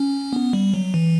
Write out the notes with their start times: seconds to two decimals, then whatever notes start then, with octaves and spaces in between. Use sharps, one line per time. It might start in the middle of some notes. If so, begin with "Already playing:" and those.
Already playing: C#4
0.33 B3
0.53 G3
0.74 F#3
0.94 E3